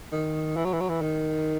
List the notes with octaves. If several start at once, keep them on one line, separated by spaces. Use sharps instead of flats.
D#3
E3
F#3
E3
F#3
E3
D#3